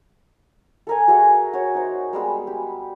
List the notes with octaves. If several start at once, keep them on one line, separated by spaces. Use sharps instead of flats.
A4 A#4 G#5
F#4 G#4 E5 F#5
F#4 C#5
D#4 C5
G3 G#3 B3 E6
G4